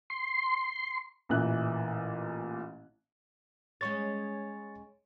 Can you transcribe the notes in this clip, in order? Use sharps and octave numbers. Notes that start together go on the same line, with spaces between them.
C6
A1 A#2 E3 F#6
G#3 C#4 C#5 C#6 A6